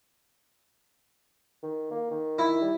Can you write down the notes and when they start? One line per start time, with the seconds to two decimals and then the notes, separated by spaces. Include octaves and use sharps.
1.63 D#3
1.90 A#3
2.11 D#3
2.39 E4
2.61 G3